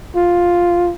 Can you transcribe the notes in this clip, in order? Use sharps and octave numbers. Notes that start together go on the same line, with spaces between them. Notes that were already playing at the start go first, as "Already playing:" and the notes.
F4